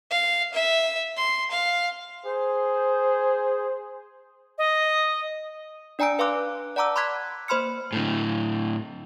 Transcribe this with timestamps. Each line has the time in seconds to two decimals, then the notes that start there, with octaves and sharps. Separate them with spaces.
0.10 F5
0.53 E5
1.16 C6
1.50 F5
2.26 G#4 C5
4.58 D#5
5.99 D4 D5 G#5 A#5 E6 D7
6.19 B4 F5 C6 D6 F#6
6.76 D5 F#5 A5 A#5 D6 E6
6.96 B5 C6 D6 F#6 G#6 B6
7.48 A#3 C5 B5 C6 F6 C#7
7.93 A2 D3